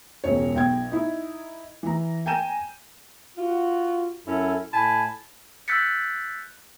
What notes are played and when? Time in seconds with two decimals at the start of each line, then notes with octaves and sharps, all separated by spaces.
0.24 E1 C#2 C#5
0.55 B1 G5 G#6
0.91 D#4 E4
1.83 E3 A#5
2.26 G5 G#5 A#5 G6 D#7 E7
3.38 F4 F#4
4.27 F#2 C#4 E4 A4
4.73 A2 G#5 A5 B5
5.68 E6 F#6 G6 A6 B6 C#7